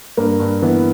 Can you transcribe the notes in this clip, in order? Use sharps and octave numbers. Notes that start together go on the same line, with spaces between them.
G2 A#3
G2
E3 B3